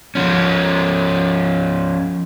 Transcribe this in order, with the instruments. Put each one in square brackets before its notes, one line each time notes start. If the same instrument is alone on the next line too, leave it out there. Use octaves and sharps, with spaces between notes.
[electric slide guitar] F3 C#4